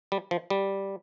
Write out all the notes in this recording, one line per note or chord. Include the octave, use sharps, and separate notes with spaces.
G3
F3
G3